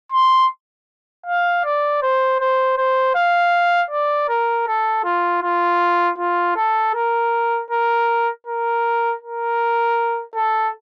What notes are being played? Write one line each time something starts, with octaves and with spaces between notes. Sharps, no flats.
C6
F5
D5
C5
C5
C5
F5
D5
A#4
A4
F4
F4
F4
A4
A#4
A#4
A#4
A#4
A4